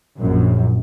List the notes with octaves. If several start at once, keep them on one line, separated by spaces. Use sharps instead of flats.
A#1 F#2